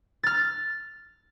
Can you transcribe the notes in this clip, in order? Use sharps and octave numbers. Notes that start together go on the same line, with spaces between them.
F6 A6